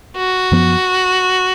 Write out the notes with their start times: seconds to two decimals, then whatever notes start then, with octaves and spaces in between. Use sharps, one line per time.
0.17 F#4
0.51 F#2 F3 B3